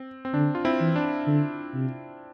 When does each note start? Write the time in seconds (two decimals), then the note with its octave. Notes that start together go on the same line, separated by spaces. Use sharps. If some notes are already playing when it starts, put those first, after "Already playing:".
Already playing: C4
0.25 C4
0.34 D3 D4
0.55 F4
0.65 C4 E4
0.80 E3
0.96 D4
1.27 D3
1.74 C3